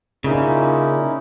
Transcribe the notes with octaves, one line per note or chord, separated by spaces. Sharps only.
A#2 C#3 C#4 D#4 E4